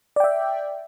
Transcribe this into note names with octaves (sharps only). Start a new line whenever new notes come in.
D5 E5 G5